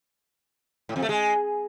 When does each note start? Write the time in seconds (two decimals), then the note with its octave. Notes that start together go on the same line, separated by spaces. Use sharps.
0.89 A2
0.96 F2
1.02 A3
1.09 G#3